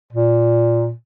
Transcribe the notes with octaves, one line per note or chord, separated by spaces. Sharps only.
A#2